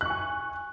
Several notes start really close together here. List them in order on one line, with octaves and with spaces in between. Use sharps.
F#6 C#6 G#5